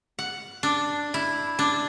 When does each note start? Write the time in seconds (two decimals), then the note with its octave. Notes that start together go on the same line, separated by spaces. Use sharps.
0.19 F#5
0.63 D4
1.14 E4
1.59 D4